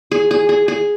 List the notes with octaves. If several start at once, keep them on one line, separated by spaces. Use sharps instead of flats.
G#4
G#4
G#4
G#4